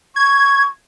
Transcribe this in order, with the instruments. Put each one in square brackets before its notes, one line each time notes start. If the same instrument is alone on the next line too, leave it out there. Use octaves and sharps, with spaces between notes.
[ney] C#6 [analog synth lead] G#6